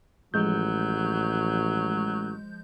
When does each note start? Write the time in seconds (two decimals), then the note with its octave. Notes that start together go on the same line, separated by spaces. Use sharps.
0.34 A1 F3 F#3 G#3 G6